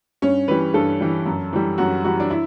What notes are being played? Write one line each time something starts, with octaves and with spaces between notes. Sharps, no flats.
G2 C#4
E3 G3 B4
G2 A4
E3 G3
F#2
E3 G3
F#2 F#4
E3 G3 F#4
D4
E4